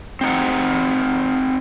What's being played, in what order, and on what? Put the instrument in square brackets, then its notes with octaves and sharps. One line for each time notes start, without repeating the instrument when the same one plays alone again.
[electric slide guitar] C4 D#4 F#5